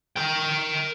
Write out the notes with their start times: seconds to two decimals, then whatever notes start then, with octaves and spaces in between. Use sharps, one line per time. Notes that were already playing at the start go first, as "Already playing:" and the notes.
0.16 A#4 G5